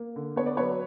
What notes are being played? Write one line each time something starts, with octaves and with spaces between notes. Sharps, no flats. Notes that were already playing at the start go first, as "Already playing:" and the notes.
Already playing: A#3
D3
B3 C#5
D5
F#3 B4 C#5